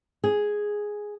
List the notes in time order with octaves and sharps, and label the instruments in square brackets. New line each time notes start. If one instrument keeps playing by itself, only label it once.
[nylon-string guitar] G#4